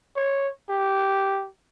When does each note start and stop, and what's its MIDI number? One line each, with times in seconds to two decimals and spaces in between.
0.16 0.48 73
0.69 1.47 67